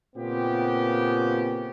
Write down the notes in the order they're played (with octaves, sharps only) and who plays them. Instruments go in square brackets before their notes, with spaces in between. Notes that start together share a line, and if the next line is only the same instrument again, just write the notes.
[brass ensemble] A#2 C#3 B3 C4 F4 G4